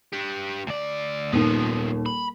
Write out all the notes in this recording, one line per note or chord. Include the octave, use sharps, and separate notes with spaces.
D4 G4
D2 D5
D#1 D#2 F3 B3
B5